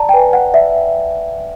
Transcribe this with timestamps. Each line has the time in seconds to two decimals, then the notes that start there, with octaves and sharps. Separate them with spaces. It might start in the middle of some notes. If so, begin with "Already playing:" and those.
Already playing: D5 A5 A#5
0.09 G5
0.14 B4 G#5
0.33 F#5
0.54 D5 E5